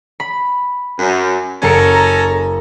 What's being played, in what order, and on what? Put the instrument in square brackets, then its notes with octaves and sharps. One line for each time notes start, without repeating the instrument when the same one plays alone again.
[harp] B5
[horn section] F#2
[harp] F#1 C#7 D7 [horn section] C#4 A4 A#5